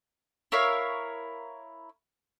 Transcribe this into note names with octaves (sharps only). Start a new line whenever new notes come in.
E4 A#4 C#5 F5